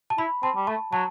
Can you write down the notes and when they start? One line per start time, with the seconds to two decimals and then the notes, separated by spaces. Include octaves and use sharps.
0.10 A5
0.18 E4 B5
0.43 C4 A5
0.56 G3
0.67 A3 A5
0.92 F#3 A5